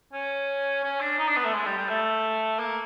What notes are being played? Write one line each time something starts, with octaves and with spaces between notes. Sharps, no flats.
C#4
C#4
D4
D#4
D4
B3
A3
G#3
G3
G3
A3
A#3